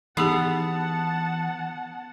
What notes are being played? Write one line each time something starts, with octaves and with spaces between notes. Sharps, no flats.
E3 B3 D#4 G4 G#4 F#5 A5